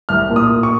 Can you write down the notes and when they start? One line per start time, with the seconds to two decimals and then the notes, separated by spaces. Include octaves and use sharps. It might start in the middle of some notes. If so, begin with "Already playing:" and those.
0.09 C2 F6
0.30 A#2
0.36 D#6
0.49 A#2
0.63 C#6